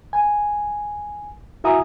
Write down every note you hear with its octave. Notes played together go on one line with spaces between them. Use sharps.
G#5
E4 F#4 E5 G#5 A#5 D#6